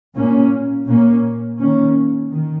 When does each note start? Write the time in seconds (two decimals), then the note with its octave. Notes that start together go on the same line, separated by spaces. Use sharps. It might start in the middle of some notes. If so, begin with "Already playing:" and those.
0.16 A#2 A#3 C#4
0.87 A#2 A#3 C#4
1.58 D#3 A#3 C#4
2.30 D#3